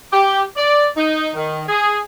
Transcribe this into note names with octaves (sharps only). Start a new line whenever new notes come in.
G4
D5
D#4
D#3
G#4